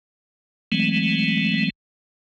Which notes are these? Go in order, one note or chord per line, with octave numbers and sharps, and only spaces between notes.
E3 F#3 G#3 A3 C4